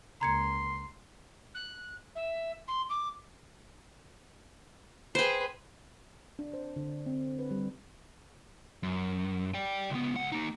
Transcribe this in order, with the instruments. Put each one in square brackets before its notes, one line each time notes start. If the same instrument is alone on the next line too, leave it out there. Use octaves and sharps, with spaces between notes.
[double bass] C#2 A#3 [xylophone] A#5 G#6 C#7 [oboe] C6
[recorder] F#6
E5
C6
D6
[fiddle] G#4 B4 [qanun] C5 G5
[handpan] D4
C5
D3
C4
B4
G3
[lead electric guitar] F#2
D5 G5
C#2 B3
C#2 F#5
A#3 D#4